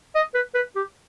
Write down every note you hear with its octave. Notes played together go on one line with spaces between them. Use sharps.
D#5
B4
B4
G4